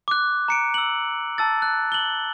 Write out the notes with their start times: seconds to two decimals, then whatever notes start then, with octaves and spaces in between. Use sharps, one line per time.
0.08 D6 F#6
0.48 A#5 C#7 D7
0.74 E6 F#7
1.38 A5 E6 A6
1.62 F#6
1.92 F#7 G7